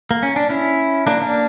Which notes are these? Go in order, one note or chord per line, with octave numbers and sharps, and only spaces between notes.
A#3
C#4
D4
C#4 E4
A#3 D4
A#3 D4